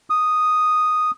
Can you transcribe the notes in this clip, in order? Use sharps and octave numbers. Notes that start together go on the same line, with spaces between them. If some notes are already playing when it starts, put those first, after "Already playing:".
D#6